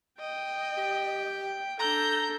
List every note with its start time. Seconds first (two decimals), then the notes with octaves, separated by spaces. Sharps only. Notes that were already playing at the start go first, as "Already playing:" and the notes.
0.19 D#5 G5
0.77 G4
1.79 D4 A4 A#5 G6